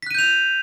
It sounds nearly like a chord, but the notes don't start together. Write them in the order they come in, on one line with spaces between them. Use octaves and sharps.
B6 F#6 D#7 G6 F7